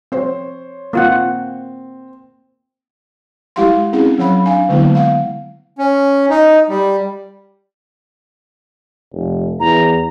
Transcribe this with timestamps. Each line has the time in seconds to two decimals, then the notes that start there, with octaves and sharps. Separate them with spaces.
0.12 C4 C5 C#5
0.93 A#3 C4 F4 F#5
3.56 G#3 E4 G4 F5 F#5 C6
3.93 C4 C#4 E4 G#4 F#5
4.19 F#3 C#5 F#5 B5
4.46 D4 F5 G#5
4.69 D3 F#3 G#3 A#3 B3 E4
4.95 F5 F#5
5.78 C#4
6.30 D#4
6.69 G3
9.13 F1
9.60 E2 A#5